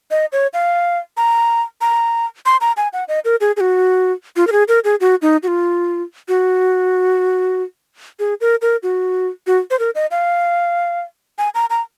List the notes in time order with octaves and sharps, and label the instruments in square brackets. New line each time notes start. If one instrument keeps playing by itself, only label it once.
[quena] D#5
C#5
F5
A#5
A#5
C6
A#5
G#5
F#5
D#5
A#4
G#4
G#4
F#4
F4
A#4
G#4
A#4
G#4
F#4
D#4
F#4
F4
F#4
G#4
A#4
A#4
F#4
F#4
C5
A#4
D#5
F5
G#5
A#5
A#5